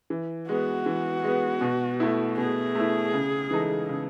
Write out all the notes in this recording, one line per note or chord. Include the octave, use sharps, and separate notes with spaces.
E3
G#3 B3 F#4
E3
G#3 B3
B2
A3 E4
B2 G#4
A3 E4
C#3
E3 G#3 D#4 A4
C#3